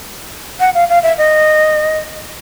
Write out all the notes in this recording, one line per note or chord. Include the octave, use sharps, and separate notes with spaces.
F#5
F5
F5
E5
D#5